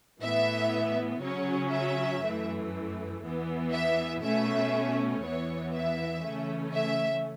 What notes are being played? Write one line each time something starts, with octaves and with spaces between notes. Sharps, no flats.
A2 E3 B3 E5
C#3 F#3 C#4 C#5
E5
F#2 E3 A3
E2 E3 B3
E5
B2 A3 C#4 E5
E2 E3 B3 C#5
E5
C#3 E3 A3 C#4
E5